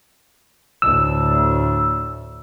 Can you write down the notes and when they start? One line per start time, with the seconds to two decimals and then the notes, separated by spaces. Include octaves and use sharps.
0.82 D2 A2 E6